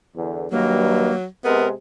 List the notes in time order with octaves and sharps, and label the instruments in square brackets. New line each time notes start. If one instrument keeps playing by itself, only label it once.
[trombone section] E2 D3
[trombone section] G2 D#3 [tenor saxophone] F#3 [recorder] A#3
[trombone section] C3 G#3 [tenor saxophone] B3 [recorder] A#4